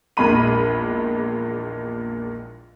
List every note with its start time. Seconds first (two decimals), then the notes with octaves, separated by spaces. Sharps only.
0.17 A#1 E2 A#2 G#3 B5 D#7